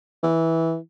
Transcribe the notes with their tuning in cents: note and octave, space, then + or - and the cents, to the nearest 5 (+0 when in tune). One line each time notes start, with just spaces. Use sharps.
E3 -10